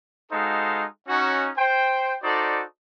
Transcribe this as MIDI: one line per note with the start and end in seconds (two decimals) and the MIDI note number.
0.32 0.85 56
0.32 0.85 63
0.32 0.85 66
0.32 0.85 69
0.32 0.85 72
0.32 0.85 77
1.08 1.49 61
1.08 1.49 63
1.08 1.49 66
1.58 2.17 72
1.58 2.17 79
2.23 2.63 63
2.23 2.63 66
2.23 2.63 69
2.23 2.63 72
2.23 2.63 74